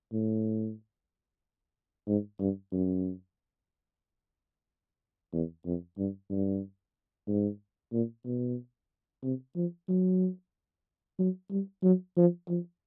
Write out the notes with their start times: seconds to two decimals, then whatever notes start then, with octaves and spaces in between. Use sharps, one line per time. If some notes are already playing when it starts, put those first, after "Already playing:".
0.13 A2
2.08 G#2
2.40 G2
2.72 F#2
5.33 E2
5.65 F2
5.98 G2
6.30 G2
7.28 G#2
7.93 A#2
8.26 B2
9.23 C3
9.56 F3
9.89 F#3
11.19 F#3
11.50 G3
11.83 F#3
12.17 F3
12.49 F3